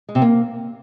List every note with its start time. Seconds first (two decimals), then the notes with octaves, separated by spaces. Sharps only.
0.09 G#3
0.15 C3
0.22 A#3